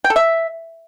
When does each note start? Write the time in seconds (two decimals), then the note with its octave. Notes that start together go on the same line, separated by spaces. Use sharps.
0.04 G5
0.10 A4
0.16 E5